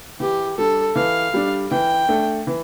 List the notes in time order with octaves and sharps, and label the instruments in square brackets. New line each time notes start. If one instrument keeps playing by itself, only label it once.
[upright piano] E3 [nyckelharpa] G4
[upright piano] G3 D4 [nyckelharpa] A4
[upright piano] E3 [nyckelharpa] F5
[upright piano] G3 D4
[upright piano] E3 [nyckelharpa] G5
[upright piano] A3 D4 A4
E3